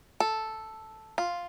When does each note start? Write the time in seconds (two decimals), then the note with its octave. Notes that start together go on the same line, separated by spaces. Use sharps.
0.20 A4
1.18 F4